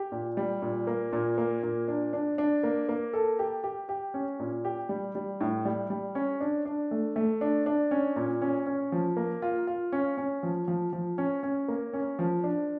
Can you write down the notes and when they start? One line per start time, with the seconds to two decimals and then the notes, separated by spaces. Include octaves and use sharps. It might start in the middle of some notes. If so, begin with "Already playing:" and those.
Already playing: G4
0.12 A#2
0.37 G3
0.62 A#2
0.87 A#3
1.13 A#2
1.38 A#3
1.63 A#2
1.88 D4
2.13 D4
2.38 D4
2.63 A#3
2.89 A#3
3.13 A4
3.39 G4
3.64 G4
3.89 G4
4.14 C#4
4.40 A#2
4.65 G4
4.89 G3
5.15 G3
5.41 A2
5.65 G3
5.90 G3
6.15 C#4
6.41 D4
6.65 D4
6.91 A3
7.16 A3
7.41 D4
7.66 D4
7.91 C#4
8.16 A#2
8.42 C#4
8.66 C#4
8.92 F3
9.17 A#3
9.42 F4
9.67 F4
9.92 C#4
10.18 C#4
10.43 F3
10.68 F3
10.93 F3
11.18 C#4
11.43 C#4
11.68 A#3
11.93 C#4
12.19 F3
12.44 D4